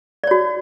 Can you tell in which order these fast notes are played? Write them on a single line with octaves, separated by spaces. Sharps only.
D5 C#5 F#4